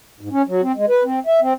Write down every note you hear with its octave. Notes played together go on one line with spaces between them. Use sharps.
G#2
C#4
F#3
C4
G#3
B4
C4
E5
C4